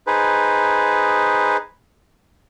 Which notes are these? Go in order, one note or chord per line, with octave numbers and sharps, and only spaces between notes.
D#4 G#4 B4 C5